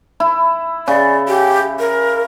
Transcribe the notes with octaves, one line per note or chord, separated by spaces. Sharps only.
E4
C#3 D5
G4
A#4